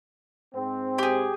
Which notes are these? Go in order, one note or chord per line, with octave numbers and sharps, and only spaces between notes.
G#2 C4
G4 G#4